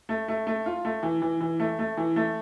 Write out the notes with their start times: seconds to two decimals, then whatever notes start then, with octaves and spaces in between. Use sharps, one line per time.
0.09 A3
0.28 A3
0.47 A3
0.66 F4
0.85 A3
1.03 E3
1.22 E3
1.41 E3
1.60 A3
1.79 A3
1.97 E3
2.16 A3